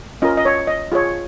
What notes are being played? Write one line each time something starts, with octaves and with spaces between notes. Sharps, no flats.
C#4 F4 A#4 D#5
D#5
C#5
D#5
F4 G#4 C#5